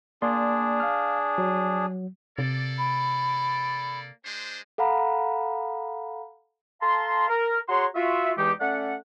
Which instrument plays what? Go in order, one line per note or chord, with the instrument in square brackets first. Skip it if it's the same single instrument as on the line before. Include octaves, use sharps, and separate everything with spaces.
[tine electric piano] A#3 D5 C6 [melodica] D4 G#4
[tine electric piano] F5 F6
F#3
[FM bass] C3 [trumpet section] A#3 A4 D5
[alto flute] B5
[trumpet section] G#3 D4 C5
[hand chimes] A4 F5 F#5 A#5 B5
[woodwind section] A4 F5 A5 A#5 C6
A#4
F#4 G#4 C#5 F#5 A#5 C6
F4 F#4 E5
E2 E3 G#3 D#4 G4
A3 C#4 D5 F#5